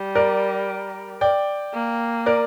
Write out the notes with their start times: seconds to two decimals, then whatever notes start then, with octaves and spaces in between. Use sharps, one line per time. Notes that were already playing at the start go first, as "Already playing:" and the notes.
Already playing: G3
0.15 A#4 D5
1.21 D5 G5
1.74 A#3
2.26 A#4 D5